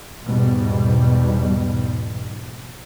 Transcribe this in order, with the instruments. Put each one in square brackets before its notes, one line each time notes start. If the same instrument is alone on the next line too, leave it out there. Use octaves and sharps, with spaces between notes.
[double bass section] E2 G#2 B2 G3